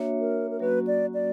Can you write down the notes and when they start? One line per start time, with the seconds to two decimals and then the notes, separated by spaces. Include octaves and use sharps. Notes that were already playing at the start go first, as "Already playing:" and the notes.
Already playing: A#3 D4 F#4 C#5 E5
0.20 A#4
0.51 A#4
0.60 F#3 A#3 C#4 F#4 B4
0.87 D5
1.14 D5